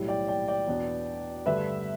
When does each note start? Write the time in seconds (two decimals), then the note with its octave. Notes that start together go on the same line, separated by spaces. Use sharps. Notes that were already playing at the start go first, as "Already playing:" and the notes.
Already playing: B1 A2 G3 E4
0.08 D5 G5
0.28 D5 G5
0.48 D5 G5
0.67 E2 B2 B3 D4
1.46 G2 D3 A3 D4 B4 E5